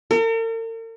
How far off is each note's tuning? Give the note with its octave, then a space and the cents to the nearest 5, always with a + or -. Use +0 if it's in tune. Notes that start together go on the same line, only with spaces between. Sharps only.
A#4 -45